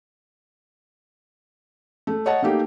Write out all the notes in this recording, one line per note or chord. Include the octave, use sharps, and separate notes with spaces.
A3
C#5 D#5 F#5 A5
A3 A#3 D#4 G4